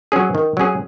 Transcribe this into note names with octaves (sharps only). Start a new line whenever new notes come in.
F#3 C#4 G#4
D#3
F#3 C#4 G#4